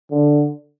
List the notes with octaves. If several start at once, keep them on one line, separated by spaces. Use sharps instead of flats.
D3